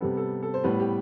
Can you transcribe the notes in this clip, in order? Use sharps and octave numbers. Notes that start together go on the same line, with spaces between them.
C3 G3 B3 A4
A4
A4
C5
A2 G3 B3 B4
G4